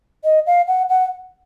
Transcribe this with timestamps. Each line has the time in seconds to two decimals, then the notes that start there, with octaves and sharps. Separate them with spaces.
0.24 D#5
0.47 F5
0.68 F#5
0.89 F#5